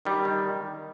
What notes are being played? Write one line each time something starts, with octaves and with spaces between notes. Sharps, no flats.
D#3 G3
D#3